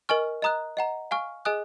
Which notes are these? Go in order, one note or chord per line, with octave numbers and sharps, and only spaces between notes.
A#4 D#5 G#5 C#6 F6
D#5 A#5 D#6 F#6
D#5 F#5 A#5
F5 G#5 C#6 F6
G#4 D#5 G#5 D#6 F#6